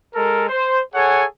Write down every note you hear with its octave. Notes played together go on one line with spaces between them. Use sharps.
G#3 A4 A#4
C5
G#4 A4 C#5 F#5 G#5